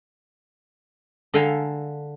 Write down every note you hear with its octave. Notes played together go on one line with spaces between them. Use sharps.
D3 A4 F5 G5 G#5 A#5